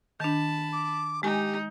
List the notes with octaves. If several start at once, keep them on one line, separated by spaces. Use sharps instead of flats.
D#3 D4 A5 B5
D6
G#3 D#4 G4 G#5